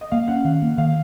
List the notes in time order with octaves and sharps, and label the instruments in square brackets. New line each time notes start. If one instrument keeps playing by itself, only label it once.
[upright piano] D#5
[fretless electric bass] A#3 [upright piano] F5
[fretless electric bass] C#4 [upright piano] F#5
[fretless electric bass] D#3 [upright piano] F5
[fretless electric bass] A#3
[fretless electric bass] D#3 [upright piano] F5